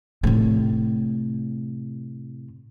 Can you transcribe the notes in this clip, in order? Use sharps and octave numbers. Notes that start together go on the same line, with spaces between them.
A2 C3